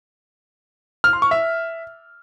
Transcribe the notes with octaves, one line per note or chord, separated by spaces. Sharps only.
F6
C6
C#6
E5